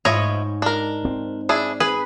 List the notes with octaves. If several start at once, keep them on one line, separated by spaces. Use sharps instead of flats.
G#2 F3 E4 C#5 D#5
D4 A#4
C4
D4 E4 G#4
G#4 B4